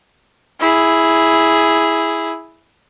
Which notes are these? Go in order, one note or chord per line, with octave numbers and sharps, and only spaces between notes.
E4 G#4